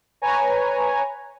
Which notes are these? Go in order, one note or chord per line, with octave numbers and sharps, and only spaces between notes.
B4 C#5 G#5 A#5